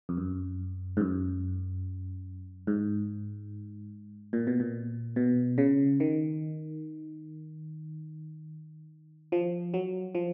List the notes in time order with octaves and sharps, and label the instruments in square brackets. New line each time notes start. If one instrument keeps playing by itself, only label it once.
[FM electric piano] F2
F#2
G#2
F#2
G#2
A#2
B2
A#2
B2
C#3
D#3
F3
F#3
F3